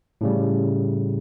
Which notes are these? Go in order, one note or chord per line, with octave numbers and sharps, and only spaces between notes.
A2 C#3 G3